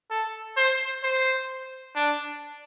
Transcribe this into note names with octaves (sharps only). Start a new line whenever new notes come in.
A4
C5
C5
D4